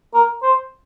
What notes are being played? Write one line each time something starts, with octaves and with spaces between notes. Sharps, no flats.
A#4
C5